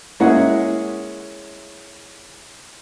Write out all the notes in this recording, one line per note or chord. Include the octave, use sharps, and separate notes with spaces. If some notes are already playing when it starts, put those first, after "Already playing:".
G#3 A#3 C#4 E4 G#4 F#5